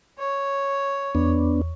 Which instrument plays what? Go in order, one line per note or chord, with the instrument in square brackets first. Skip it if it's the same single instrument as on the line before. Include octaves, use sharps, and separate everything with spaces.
[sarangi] C#5
[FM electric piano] E2 [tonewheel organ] B3 D4